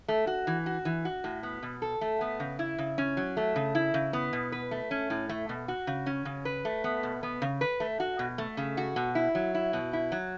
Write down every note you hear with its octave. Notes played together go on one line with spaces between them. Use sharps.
A3
F#4
E3
F#4
E3
F#4
A2
B3
B2
A4
A3
B3
C#3
E4
C#3
C#4
F#3
A3
C#3
E4
C#3
B3
B2
B4
A3
C#4
A2
A3
B2
F#4
C#3
C#4
C#3
B4
A3
B3
B2
B3
C#3
B4
A3
F#4
B2
A3
C#3
F#4
B2
E4
F#3
E4
B2
E4
F#3